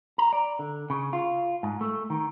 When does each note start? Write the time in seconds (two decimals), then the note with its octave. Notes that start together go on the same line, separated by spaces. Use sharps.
0.18 A#5
0.33 D5
0.59 D3
0.90 C#3
1.13 F4
1.63 G#2
1.81 A3
2.10 D#3